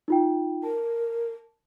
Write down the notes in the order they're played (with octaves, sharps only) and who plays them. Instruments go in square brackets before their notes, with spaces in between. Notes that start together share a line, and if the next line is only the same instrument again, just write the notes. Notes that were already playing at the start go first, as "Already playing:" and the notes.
[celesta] D#4 F4 G5
[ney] A#4 [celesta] A5